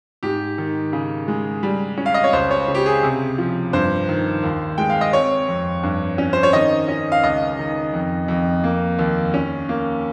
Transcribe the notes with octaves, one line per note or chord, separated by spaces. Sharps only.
G#2 G4
D#3
C#3
G#3
G3
C#4
F5
D#5
C#5
C#2 C5
C#5
C#3
G4
G#4
C3
F3
G2 C5
D#3
D#2
G#3 G5
F5
D#5
C4 C#5
F2
G2
C#4
C5
C#5
D#3 D#5
C#4
F5
C#2 D#5
D#3
F2
F2
A#3
D#2
C#4
A#3